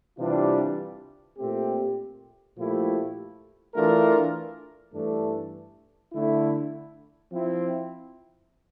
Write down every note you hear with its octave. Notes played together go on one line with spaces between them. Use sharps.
C3 E3 G3 D4 F4
A#2 A3 C4 G4
A#2 F3 A3 E4 G4
E3 A3 D4 F4 A#4
G2 E3 A3 D4 A4
D3 A3 E4
F3 C4 E4